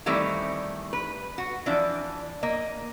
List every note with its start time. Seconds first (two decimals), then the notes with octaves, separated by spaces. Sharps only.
0.06 D#3 E3 G3 A3 C4
0.93 B4
1.38 F#4
1.66 E3 F3 D4
2.43 A#3 D#5